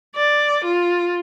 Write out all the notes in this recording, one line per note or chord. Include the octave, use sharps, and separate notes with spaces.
D5
F4